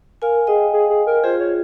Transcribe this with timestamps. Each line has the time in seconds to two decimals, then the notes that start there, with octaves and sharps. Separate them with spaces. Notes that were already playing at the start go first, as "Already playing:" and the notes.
0.22 A#4 F5 G#5
0.47 G#4 D#5 G5
0.73 G#4
0.90 G#4
1.07 A#4
1.24 F4 G#4 C5
1.40 C#5